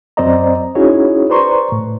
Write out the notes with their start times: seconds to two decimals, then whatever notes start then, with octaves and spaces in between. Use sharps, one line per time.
0.17 F#2 C4 C5 D5 D#5 A#5
0.75 C#4 D#4 E4 F#4 G#4 C#5
1.30 B4 C5 D5 A#5 C6 C#6
1.72 A2